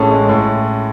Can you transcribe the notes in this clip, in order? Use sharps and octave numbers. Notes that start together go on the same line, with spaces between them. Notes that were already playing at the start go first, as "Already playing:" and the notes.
Already playing: A1 A2 G#3 C#4 G#4 A4
G#3
A2